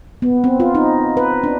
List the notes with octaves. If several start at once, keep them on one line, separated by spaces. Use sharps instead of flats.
B3
C4
F4
D#4
B4
D4